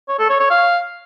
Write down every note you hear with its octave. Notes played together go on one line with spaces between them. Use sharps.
C#5
A4
C#5
C#5
F5